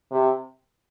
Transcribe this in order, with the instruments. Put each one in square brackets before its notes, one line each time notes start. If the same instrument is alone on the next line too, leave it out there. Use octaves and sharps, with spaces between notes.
[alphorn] C3